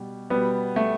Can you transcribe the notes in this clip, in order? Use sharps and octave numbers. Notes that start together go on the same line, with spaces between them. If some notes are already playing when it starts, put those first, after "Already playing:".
Already playing: B2 G3
B2 G3 B3
A3